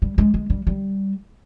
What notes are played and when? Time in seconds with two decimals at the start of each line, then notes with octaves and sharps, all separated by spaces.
0.02 G3
0.18 G#3
0.34 G#3
0.50 G3
0.67 G3